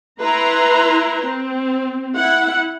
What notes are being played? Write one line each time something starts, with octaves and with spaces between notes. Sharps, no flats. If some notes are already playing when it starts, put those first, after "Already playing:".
E4 B4 A#5 C6
C4
E4 F#5